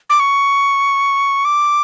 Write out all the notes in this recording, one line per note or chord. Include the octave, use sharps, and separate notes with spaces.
D6
C#6
D6